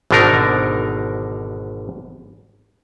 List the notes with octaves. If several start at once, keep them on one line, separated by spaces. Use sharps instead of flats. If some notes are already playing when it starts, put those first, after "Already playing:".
G#1 B2 D3 D4 D#4 A#4